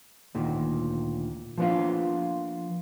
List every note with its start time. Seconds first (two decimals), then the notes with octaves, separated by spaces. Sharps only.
0.35 D2 A#2 D#3
1.58 F3 A#3 B3 D4 F4